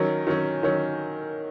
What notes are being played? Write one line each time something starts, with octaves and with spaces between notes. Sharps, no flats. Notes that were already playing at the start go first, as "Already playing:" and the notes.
Already playing: D#3 F#3 C#4
D#3 F#3 C#4
D#3 F#3 C#4